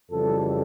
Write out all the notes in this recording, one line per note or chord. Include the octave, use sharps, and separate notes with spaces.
F2 C#3 E3 G3 A4